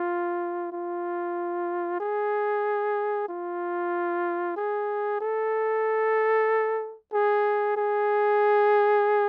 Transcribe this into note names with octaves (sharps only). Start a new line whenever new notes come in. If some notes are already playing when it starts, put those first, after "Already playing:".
Already playing: F4
F4
G#4
F4
G#4
A4
G#4
G#4